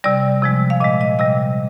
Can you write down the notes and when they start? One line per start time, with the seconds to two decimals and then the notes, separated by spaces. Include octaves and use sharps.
0.04 C3 G3 D5
0.42 C3 F3 G#3
0.70 F5
0.80 A#2 D#5
0.85 G#3
1.01 D#5
1.19 C3 G3 D#5